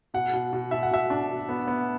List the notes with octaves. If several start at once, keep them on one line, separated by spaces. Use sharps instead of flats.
B2 F#5
B2
B2
B2 E5
F#5
B2 E5
D4
B2
B3
B3